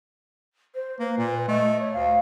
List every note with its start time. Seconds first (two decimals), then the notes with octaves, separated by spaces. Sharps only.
0.75 C5
0.99 A#3 B4
1.18 A#2
1.48 A3 D#5
1.80 C#5
1.93 D2 F5